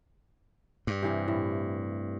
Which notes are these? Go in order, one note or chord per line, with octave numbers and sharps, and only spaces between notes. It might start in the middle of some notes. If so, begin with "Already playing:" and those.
G2
C3 E3 F5
A2